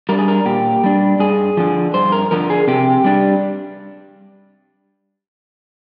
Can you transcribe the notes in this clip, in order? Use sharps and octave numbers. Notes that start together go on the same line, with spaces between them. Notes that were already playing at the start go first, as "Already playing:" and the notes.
G3 D4 A#4
G#4
A#4
A#2 G4
G3 D4
G2 G#4
D3 F3
G2 C5
A#4
D3 F3 A#4
G#4
C3 G4
G3 D4